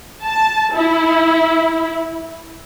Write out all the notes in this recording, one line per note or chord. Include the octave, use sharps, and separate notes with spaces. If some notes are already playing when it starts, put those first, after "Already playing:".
A5
E4